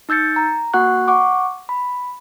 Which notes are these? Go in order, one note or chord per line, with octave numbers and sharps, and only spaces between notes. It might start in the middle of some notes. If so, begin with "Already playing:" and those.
D#4 E6 G6 A6 C#7
A#5
A#3 F#4 F#5 C#6 F#6
F#5 C#6 D6
B5